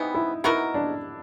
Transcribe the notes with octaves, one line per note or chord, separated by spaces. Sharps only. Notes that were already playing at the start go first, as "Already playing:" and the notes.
Already playing: C3 E3 G3 B3 D#4
E4
B3 D#4 E4 F#4 A#4
D4